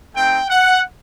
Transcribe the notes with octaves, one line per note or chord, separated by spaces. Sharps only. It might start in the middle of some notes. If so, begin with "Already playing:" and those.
A3 C4 D#4 G5
F#5